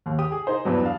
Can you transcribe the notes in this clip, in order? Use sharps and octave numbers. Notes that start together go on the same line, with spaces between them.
D#2
G4 D#6
G#4
D#4 G#4 C5
E2 G2 E3 F#3
D4 F5